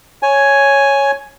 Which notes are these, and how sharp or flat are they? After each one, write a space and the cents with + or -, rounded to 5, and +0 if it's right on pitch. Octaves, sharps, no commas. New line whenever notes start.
C#5 +0 G#5 +5